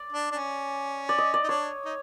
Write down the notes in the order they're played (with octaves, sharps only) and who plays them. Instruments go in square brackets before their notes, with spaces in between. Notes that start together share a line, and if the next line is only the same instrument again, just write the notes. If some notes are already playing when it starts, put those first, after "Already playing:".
Already playing: [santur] D5
[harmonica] D4
D4
C#4
[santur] D5
D#5
D5
[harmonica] D#4
[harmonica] D4 [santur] C#5
[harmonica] D#4